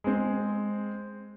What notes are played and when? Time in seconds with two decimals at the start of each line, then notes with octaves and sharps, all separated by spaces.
0.04 G#3 C4